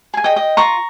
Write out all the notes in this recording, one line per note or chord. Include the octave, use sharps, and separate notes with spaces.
G#4 G#5
D#5 G5
D#5
F4 A#5 C#6